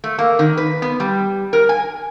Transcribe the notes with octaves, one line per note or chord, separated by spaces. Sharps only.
A3
A#3
D#3
B4
B3
G3
A#4
G#5